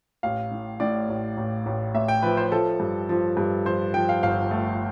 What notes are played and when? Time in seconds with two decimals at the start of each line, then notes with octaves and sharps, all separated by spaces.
0.23 A1 F5
0.51 A2
0.80 A2 D5
1.09 A1
1.37 A1
1.66 A1
1.94 A1 E5
2.08 G5
2.23 F3 B4
2.37 C5
2.52 F3 A4
2.80 G2
3.09 F3
3.37 G2
3.65 F3 C5
3.94 F3 G5
4.09 F5
4.23 G1 F5
4.51 A3